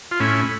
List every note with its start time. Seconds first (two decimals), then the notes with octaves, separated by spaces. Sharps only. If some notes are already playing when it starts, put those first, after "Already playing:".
0.11 F4
0.20 A2 C#4 E4